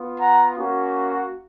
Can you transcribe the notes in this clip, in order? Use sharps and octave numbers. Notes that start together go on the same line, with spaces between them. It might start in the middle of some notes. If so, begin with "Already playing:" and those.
Already playing: B3 F4
F#5 A#5
A#3 C#4 F#4